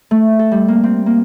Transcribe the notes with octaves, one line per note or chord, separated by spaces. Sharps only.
A3
A4
G3
A#3
C4
A#3